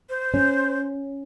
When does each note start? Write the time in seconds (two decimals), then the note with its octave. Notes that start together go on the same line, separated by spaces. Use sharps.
0.09 C5
0.34 C#4